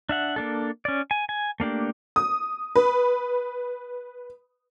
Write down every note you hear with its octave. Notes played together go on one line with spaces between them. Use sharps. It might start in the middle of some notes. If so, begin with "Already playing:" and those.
D4 E5 F#5
A#3 D4 A4
C#4 D5
G#5
G#5
A3 A#3 D4 G4
D#6
B4